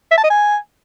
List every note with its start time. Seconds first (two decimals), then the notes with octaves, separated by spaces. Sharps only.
0.11 E5
0.18 A5
0.24 D#5
0.30 G#5